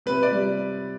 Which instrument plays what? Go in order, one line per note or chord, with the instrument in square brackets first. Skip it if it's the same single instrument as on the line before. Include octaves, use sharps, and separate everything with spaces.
[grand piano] C3 B4
D5
G3